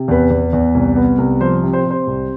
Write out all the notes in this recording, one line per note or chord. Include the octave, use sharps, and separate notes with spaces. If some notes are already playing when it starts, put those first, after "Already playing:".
Already playing: C3
E2 B4
E2
E2
C2
B3
C2
F3 C5
C3
C5
C3
C5
C2